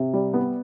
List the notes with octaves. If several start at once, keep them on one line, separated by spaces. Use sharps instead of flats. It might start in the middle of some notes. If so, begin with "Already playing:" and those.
Already playing: C3
G3
B3